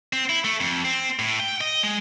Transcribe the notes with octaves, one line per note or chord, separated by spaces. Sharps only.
C4
E4
A3
F2
C4
A2
G5
D#5
G#3